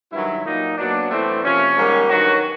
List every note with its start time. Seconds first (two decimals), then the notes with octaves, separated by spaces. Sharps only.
0.12 G2 D#3 F#3 E4
0.45 A#2 F#3 A#3 D#4
0.78 B2 F#3 A#3 D4
1.11 A2 E3 A3 C4
1.44 C3 F3 A#3 C#4
1.76 G#2 D#3 G3 A#3
2.09 G2 D#3 F#3 F#4